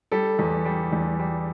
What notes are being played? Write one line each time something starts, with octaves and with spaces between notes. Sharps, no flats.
G3 A4
E2
G3
E2
G3